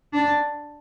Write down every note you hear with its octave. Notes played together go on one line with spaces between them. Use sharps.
D4